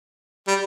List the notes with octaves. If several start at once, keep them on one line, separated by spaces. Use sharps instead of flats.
G3